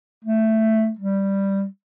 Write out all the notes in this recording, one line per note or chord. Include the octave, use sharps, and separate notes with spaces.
A3
G3